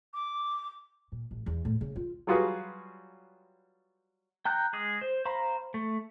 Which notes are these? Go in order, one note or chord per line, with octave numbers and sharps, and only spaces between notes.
D6
A#2
A1
E2
A2
C#3
F4
F#3 G3 F4 F#4 G#4 B4
G5 A#5 F#6 G6
G#3 G#4 D#6
C5
C5 F5 A#5 B5
A3